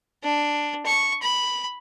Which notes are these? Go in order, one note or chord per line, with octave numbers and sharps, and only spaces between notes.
D4
C#6
B5